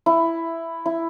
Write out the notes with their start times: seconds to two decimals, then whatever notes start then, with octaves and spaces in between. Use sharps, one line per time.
0.06 E4
0.86 E4